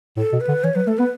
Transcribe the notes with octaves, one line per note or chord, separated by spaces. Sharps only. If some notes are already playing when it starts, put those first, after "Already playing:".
A2 A4
B2
B4
D3
E3 C#5
F#3 B4
A3 A4
B3 B4